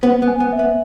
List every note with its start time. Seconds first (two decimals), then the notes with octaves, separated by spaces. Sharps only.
0.03 B3 C5
0.22 B3
0.28 G#5
0.40 B3
0.52 E5
0.59 B3